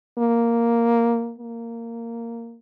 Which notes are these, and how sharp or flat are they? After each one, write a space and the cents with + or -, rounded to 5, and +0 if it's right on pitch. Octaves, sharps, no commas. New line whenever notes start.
A#3 +0
A#3 -10